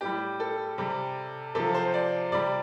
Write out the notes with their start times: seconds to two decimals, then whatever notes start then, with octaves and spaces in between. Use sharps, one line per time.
0.01 A2 G3 G4
0.40 A4
0.78 C3 G3
1.55 C3 F3 A4
1.74 C5
1.94 D5
2.32 C3 G3 D5